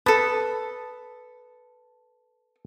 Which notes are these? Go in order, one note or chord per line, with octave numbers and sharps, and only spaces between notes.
A4 B4 A5 D#6